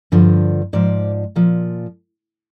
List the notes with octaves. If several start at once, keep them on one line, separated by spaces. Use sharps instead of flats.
G2 D3 F3
G#2 F3 D5
A#2 F3